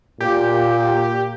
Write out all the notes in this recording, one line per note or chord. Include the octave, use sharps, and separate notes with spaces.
A#2 G4